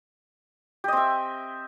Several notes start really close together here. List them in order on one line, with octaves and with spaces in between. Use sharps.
G4 D#5 C4 E5